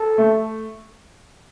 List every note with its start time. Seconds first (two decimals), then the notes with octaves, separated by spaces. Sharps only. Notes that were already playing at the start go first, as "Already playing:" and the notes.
Already playing: A4
0.18 A3